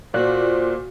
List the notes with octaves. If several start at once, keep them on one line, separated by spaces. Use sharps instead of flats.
A#2 F4 F#4 C5 D5 F#6